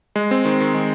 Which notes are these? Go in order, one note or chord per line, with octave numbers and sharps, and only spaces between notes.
G#3
C4
D#3
D#3
G#3